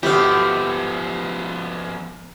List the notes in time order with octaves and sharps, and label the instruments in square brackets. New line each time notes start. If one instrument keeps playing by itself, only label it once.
[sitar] B2 A3 C4 [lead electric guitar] F3 B3 [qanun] G4 F5